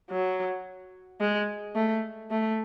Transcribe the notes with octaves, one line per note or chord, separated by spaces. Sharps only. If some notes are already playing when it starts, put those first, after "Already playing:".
F#3
G#3
A3
A3